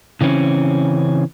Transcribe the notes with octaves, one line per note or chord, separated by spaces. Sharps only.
C#3 E3 C4 C#4